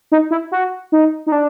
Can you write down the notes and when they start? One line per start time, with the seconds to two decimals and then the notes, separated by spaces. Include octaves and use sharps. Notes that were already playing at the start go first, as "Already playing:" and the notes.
0.12 D#4
0.31 E4
0.52 F#4
0.92 D#4
1.27 D#4
1.32 D4